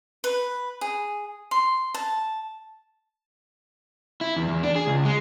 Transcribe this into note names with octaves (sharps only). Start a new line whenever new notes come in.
B4
G#4
C6
A5
E4
E2
E2
D4
G#4
C#2
G#3